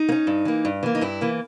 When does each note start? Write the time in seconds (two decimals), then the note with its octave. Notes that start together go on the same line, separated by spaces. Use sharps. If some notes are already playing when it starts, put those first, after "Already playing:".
Already playing: D#4
0.09 A#3
0.12 C#4
0.27 G2
0.45 E3 A#3
0.65 G2
0.83 E3 A#3
0.95 D#4
1.01 G2 E4
1.21 E3 A#3